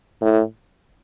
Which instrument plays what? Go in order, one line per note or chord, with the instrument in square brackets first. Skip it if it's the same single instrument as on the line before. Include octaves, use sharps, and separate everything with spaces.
[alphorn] A2